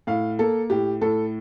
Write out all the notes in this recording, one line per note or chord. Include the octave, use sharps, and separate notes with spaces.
A2 F5
A#3 A4
A2 G4
A2 A4